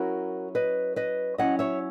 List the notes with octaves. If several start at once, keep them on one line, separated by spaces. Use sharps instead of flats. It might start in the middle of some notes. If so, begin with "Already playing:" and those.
Already playing: F#3 C#4 E4 F#4 A#4
B4 D#5
B4 D#5
F#3 C#4 E4 D#5 F#5
C#5 E5